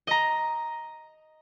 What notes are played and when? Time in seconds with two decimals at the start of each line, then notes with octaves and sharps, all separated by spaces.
0.07 D#5 A#5